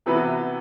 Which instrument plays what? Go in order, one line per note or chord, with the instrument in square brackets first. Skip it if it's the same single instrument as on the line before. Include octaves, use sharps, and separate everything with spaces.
[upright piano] C3 E3 B3 F#4 B4